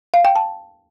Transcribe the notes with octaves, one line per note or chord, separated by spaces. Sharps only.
F5
G5
A5